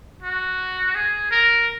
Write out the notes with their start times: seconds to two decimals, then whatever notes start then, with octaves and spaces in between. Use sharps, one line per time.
0.22 F#4
0.95 G#4
1.31 A#4